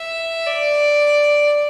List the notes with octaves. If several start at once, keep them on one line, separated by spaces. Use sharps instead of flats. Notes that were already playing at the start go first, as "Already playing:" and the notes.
Already playing: E5
D5